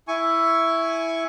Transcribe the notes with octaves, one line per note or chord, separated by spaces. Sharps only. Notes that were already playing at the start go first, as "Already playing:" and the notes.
E4 G#5 C#6